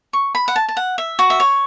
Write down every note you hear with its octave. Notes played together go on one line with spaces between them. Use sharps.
C#6
B5
F#5
A5
A5
F#5
E5
F#4
E5
C#5